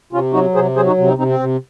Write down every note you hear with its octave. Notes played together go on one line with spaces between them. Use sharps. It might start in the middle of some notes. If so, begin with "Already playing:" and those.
C3 C#4 F4
F#3 D#4 F#4
C3 G#4 C5
F#3 G#4 C5
D#4 F#4
C3
C4 D#4
C3 C4 D#4
C4
C3